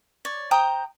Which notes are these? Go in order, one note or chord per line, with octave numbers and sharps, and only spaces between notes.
C#5 D5
C5 G5 A#5 D#6